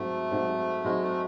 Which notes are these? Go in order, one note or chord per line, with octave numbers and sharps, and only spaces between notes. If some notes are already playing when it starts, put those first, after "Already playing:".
Already playing: G#2 F#3 A3 C4
G#2 F#3 C4 D#4
G#2 F#3 G#3 C4 D#4
A3